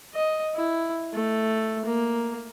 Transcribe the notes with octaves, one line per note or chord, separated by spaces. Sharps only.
D#5
E4
A3
A#3